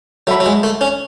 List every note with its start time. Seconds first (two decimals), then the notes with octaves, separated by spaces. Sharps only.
0.27 F#3 A4 E5 B5
0.40 F#3
0.46 G#3
0.63 A3
0.81 C#4